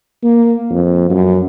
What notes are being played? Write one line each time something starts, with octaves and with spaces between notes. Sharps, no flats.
A#3
F2
F#2